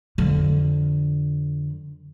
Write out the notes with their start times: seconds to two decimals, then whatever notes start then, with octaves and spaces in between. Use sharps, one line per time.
0.18 F2 D3